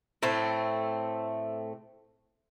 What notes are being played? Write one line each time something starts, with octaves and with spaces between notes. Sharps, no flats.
A2 A3 C4